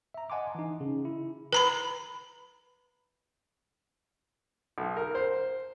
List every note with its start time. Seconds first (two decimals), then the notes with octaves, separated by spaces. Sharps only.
0.14 E5 A#5
0.30 D#5 F#5 G#5 A5 C6 D6
0.55 E3 D#4
0.80 C#3
1.05 E4
1.53 B4 A#5 B5
4.78 B1
4.97 A#4
5.15 C5